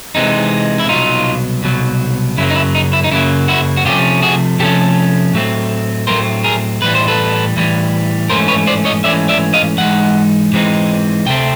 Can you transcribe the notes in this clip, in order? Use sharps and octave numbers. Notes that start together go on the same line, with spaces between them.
C3 E3 G#3 C4 D#4
E4
C2 B2 F#3 D#4 F4
C2 B2 F#3
F#2 C#3 F#3 A#3 E4
D#4
E4
D#4
E4
D#4
F#2 C#3 F#3 A#3 E4
E4 F#4
F#4
C3 F3 A3 C#4 F4 G4
F#4 G#4
C3 F3 A3 C#4 G4 A4
A2 F#3 A3 C4
A2 F#3 A3 C4 A#4 C5
G#4 A#4
A2 E3 G3 B4
C5
A4 B4
A2 E3 G3
G#2 E3 A3 C#4 A#4 C5
B4 C#5
C5 D5
C#5 D#5
G#2 E3 A3 C#4 D5 E5
D5 E5
D#5 F5
G#2 E3 G#3 D#4 F#5
G#2 E3 G#3 C4 D#4
D2 C3 A3 C4 G5